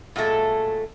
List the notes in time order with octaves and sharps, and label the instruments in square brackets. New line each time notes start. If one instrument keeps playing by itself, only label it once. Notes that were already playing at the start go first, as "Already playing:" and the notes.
[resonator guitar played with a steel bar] A#2 F#3 G#3 A3 A4